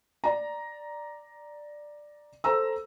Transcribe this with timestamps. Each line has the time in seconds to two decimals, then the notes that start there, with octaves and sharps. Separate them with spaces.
0.24 D5 A#5
2.44 A4 C5 A#5 E6